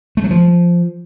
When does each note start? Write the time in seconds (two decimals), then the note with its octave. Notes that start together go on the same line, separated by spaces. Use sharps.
0.17 A3
0.24 F#3
0.31 F3